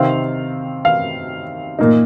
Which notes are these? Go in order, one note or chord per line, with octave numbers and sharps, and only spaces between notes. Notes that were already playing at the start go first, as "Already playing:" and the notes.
Already playing: C3 D#3 C4 F5
F5
A#2 A#3 D#4